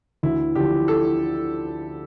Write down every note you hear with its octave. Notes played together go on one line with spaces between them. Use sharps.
D2 E4
D3 F3 G4
A4